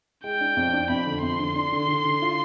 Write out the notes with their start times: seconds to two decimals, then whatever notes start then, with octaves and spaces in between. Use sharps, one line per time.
0.24 G#3 G5
0.41 D4
0.57 F2
0.73 D4
0.89 F2 B5
1.06 D3
1.22 F2 C6
1.39 D3
1.56 D4
1.72 D3
1.88 D3
2.05 D3
2.22 F4